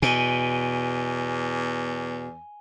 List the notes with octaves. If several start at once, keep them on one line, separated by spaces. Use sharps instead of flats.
E2 B2 G#5 D#7 G7